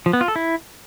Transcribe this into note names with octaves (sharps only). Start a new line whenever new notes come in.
F3
B3
F4
A4
E4